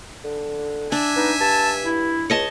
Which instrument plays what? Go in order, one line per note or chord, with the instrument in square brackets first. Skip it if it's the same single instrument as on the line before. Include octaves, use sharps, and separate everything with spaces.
[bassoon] D3
[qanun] D4 [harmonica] E5 G#5
[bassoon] B3 [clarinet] D#4
[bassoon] G2 [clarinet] A5
[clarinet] E4
[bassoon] C#2 [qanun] C#5 D#5 A5